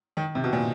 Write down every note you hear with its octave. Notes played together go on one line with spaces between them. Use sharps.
D#3
C3
B2
A#2